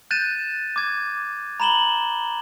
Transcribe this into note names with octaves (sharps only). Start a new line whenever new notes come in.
F#6 G6 A6 D#7 E7
D6 G#6
A#5 B5 E7 F#7 G7